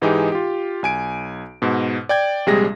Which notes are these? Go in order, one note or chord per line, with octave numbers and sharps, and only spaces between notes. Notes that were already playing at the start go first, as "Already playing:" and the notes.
G#2 E3 G#3 D#4 G4 G#4
F4 G4
B1 G#5 D7
G#2 B2
D5 G5 G#6
A#1 C3 G3 G#3 G#4 A#6